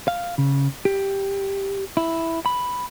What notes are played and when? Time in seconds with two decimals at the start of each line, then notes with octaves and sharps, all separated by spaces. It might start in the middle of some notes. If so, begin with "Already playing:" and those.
0.08 F5
0.38 C#3
0.85 G4
1.97 E4
2.46 B5